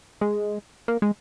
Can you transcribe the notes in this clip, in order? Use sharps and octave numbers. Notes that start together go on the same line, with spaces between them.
G#3
A#3
G#3